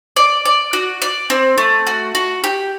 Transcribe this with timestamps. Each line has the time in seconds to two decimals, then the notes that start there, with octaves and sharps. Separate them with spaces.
0.16 D5
0.45 D5
0.73 F#4
1.02 D5
1.30 C4
1.58 A3
1.87 F#4
2.15 F#4
2.44 G4